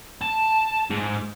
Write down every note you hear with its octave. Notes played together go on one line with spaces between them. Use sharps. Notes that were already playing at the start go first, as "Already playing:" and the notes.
A5
G#2